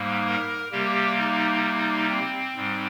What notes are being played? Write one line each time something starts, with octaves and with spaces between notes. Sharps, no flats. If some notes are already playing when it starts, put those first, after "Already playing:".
Already playing: G#2 G3 A#3
A#4
C3 G3 A#3 G4
D#4
D#4
C4
G#2 G3